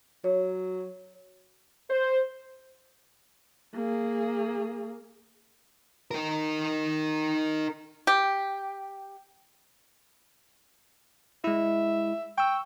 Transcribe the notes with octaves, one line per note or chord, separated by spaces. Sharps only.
F#3 C#5
C5
A#3 G#4
D#4 A#4
G4
G#3 E4 E5
G5 C#6 E6